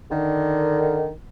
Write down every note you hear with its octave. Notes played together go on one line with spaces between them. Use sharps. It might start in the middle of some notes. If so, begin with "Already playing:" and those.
D3 D#3